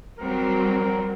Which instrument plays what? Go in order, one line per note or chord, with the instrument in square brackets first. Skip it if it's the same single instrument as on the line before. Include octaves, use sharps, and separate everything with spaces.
[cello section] F#3 G3 C4 [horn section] A#4